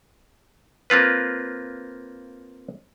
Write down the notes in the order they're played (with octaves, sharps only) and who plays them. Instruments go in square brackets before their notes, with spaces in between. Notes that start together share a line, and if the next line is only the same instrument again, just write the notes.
[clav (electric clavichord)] A#3 C4 F4 B4